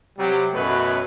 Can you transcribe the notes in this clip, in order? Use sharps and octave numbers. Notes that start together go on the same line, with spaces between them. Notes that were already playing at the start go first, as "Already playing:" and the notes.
C3 F#3 G3
A1 F#2 B2 F#3 A3 B4